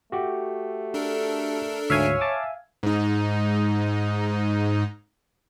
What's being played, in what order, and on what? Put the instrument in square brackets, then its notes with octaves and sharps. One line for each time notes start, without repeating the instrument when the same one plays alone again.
[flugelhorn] A3 [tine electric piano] F#4 G4
[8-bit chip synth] D4 A4 A#4
[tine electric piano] D2 G#2 [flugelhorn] C#5 [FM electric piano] E5 F5 G#5
[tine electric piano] A5 D6
[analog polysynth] G#2 D#4